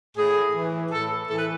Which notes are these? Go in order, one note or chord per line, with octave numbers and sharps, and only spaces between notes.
A2 G#4
E3
A2 A4
E3 A4
B4